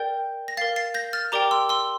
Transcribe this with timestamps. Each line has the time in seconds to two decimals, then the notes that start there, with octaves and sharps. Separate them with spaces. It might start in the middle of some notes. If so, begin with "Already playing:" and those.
Already playing: A#4 D5 G5 G6
0.48 A#6
0.57 A#4 F5 A6 C7
0.76 A6 C7
0.94 G6 A#6
1.13 F6 A6
1.32 G4 A#4 D5 G5 A#5 D6
1.51 C6 E6
1.69 C6 E6